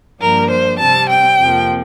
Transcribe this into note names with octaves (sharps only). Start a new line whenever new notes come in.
G2 F3 A#3 D4 A#4
C5
C3 G3 C4 A5
G5
F2 C3 F3 A#3